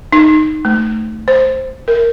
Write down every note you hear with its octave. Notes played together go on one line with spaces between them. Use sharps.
D#4
A3
C5
A#4